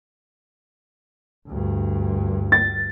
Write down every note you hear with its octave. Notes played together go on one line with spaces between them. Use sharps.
D2 G2
A6